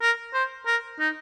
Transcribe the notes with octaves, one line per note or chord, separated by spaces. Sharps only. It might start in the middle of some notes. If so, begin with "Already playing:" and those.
A#4
C5
A#4
D#4